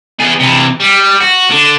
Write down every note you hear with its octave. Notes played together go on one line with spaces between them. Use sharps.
E2 G#4
C3 E3
G3
F#4
D3